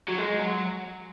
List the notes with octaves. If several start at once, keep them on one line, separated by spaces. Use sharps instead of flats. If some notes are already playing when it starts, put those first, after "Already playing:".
F#3
G#3
F#3